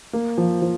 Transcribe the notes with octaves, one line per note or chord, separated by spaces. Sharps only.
A#3
F3
F3